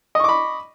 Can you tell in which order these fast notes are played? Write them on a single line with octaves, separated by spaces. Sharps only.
D#5 C#6 D6 B5